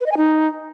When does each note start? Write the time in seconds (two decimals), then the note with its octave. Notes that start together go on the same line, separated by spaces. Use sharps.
0.01 B4
0.06 D#5
0.12 G#5
0.17 D#4